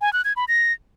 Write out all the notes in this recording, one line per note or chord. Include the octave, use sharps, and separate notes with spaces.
G#5
F#6
G#6
B5
A#6